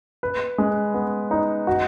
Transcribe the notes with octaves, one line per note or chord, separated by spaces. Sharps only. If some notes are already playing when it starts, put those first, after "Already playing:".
B4
G#3
B3
D#4
F#4